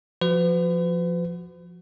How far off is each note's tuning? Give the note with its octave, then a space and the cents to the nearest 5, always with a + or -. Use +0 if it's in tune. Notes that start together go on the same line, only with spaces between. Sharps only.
F3 +5 F#4 +0 B4 +40